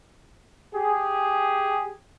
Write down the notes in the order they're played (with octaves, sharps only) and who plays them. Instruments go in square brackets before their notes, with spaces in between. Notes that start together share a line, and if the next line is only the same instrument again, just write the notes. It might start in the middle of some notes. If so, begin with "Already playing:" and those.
[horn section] G4 G#4